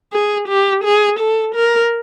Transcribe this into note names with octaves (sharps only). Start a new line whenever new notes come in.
G#4
G4
G#4
A4
A#4